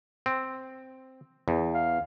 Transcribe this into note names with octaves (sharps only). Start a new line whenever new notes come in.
C4
E2
F5